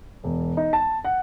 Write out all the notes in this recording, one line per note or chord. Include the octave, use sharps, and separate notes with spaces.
E1
D#4
A5
F#5